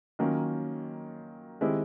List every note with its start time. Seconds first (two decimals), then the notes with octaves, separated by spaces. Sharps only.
0.19 D#3 F#3 A#3 C#4 F4
1.61 D#3 G#3 C4 E4 G4